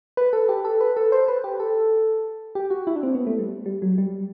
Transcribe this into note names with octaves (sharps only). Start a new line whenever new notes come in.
B4
A4
G4
A4
B4
A4
C5
B4
G4
A4
G4
F#4
E4
D4
C4
B3
A3
G3
G3
F#3
G3